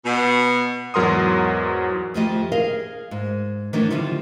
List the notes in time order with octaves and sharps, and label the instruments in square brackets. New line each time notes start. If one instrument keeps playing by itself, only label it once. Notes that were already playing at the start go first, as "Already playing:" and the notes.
[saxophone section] B2
[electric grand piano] E2 G#2 F#3 A#4 C6 D#6
[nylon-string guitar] F2 D#3 F3 A3 G4 D#5
G#4 A#4 D#5 F5
G#2
D#3 E3 F#3 A3 D4 D#4
D3 D#3 F3 G3 C#4 F4